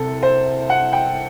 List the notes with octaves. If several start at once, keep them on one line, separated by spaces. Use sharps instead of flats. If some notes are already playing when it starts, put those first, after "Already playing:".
Already playing: C2 C3 A4
C5
F#5
G5